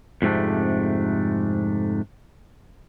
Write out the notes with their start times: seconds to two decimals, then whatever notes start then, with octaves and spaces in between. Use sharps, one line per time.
0.22 F2 G#2 C3 A3 D4